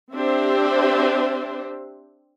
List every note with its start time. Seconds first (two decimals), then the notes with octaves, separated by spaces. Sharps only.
0.12 C4 D4 G4 C5 E5